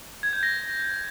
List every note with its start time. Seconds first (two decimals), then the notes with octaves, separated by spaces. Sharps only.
0.23 G#6
0.33 G6
0.43 A#6